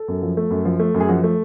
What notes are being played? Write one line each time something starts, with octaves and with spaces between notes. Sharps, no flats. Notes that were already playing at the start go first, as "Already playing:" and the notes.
Already playing: A4
F#2
F3
A3
F#2
F3
A3
F#2
G#4
F3 F#4
A3